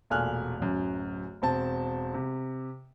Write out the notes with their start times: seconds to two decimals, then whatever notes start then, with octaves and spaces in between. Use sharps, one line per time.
0.10 E1 A#2 A3 G#5 F6 F#6
0.59 D1 F#2
1.42 E1 C4 A5
2.14 C3